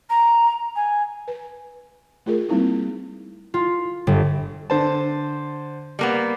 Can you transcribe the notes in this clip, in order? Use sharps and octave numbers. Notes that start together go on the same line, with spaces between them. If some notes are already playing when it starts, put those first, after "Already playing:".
A#5
G#5
B4
A3 F4 G#4 A#4
G3 A#3 C4 D#4 E4
F4
G1
D3 C5 A5
G3 A#3 B3